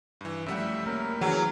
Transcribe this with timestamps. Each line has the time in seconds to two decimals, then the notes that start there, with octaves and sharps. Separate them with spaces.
0.21 G2 E3
0.46 F#2 F3 G3 A3 E5 F#5
0.86 A#3 C#4 A#4
1.21 E3 F#3 C#4 G#4